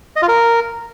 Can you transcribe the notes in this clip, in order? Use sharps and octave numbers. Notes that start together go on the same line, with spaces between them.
D#5
F4
A#4